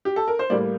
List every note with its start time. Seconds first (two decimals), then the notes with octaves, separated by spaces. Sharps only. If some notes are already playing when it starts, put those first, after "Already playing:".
0.05 G4
0.16 A4
0.28 A#4
0.39 C5
0.50 A2 G3 A#3 D5